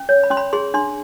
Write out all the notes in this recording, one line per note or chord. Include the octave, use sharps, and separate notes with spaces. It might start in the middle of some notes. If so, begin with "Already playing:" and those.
Already playing: C#4
C#5
B5
C#4 C6
B5
G#4 C6
D4 C6